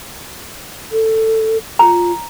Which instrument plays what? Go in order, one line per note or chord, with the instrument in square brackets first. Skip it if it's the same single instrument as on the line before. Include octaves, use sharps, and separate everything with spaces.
[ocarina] A4
[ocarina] F4 [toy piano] A#5